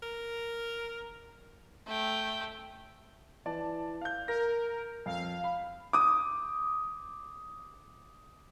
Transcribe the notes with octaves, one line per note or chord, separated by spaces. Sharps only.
A#4
A3 G5
E3 D5 A5
F5 G6
A#4 A#6
F2 F5
B5
D6 D#6